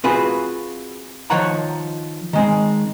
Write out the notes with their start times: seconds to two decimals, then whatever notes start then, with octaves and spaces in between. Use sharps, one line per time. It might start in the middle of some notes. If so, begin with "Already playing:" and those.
0.04 C4 F4 F#4 G#4 B4
1.30 D#3 F3 C#5 F#5 A#5
2.33 D#3 G#3 C4